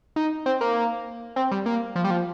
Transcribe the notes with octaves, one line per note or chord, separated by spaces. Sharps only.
D#4
C4
A#3
C4
G3
A#3
F3
G3
F3